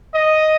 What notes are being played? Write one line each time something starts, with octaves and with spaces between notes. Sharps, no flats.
D#5